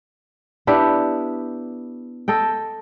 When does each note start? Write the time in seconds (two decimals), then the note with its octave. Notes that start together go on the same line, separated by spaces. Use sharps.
0.67 B3 D4 E4 G4
2.28 A4 D#5 G5